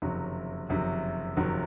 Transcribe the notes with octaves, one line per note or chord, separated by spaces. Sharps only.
F#1 F2 C3 D#3 F#3
F#1 F2 C3 D#3 F#3
F#1 F2 C3 D#3 F#3